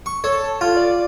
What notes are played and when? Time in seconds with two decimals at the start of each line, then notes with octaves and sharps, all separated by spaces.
0.06 C#6
0.24 A4 C#5
0.61 F4
0.77 D5